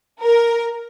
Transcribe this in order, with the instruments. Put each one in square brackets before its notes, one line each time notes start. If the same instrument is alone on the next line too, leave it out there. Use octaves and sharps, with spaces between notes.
[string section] A#4